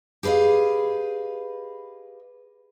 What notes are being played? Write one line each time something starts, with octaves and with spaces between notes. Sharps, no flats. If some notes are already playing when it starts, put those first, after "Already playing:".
G4 G#4 B4 D#5 F5